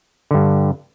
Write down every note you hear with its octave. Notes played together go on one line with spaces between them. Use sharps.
G2 D3